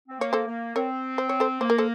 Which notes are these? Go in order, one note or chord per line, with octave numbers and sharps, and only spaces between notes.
C4
A#3 C#5
A4 C5
A#3
C4 A#4 C#5
C5
C#5
A4 C5
A#3 C5
A#4
A4 C5